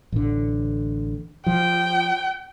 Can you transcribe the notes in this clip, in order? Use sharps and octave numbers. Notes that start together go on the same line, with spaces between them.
A1 D3
F3 G5